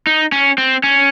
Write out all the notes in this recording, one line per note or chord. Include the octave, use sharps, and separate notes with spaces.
D#4
C#4
C4
C#4